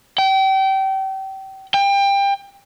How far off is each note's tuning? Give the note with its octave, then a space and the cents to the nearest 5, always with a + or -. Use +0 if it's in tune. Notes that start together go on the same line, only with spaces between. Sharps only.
G5 -30
G5 +25